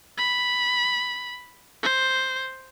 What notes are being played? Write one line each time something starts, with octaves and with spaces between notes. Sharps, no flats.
B5
C5